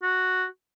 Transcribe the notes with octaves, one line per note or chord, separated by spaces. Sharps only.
F#4